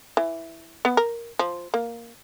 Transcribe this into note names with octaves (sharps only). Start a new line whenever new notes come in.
E3
B3
A#4
F3
A#3